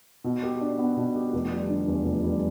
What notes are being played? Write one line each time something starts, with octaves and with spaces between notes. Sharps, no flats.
B2
G4
D4
B3
B2
G4
F1
G3
D3
E2
F1
G3